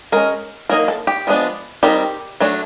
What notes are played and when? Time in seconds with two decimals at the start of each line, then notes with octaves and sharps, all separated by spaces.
0.12 G#3 C#4 A#4
0.69 F#3 A#3 D#4 A#4
0.88 A4
1.07 G4
1.27 F3 G#3 B3 D4
1.83 D#3 G3 C4 D#4 G4
2.40 F#3 A3 D4